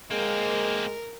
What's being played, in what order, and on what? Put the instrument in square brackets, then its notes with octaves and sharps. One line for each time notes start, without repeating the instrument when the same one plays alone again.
[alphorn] G#3 [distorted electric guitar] A#3 C4 [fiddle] A#4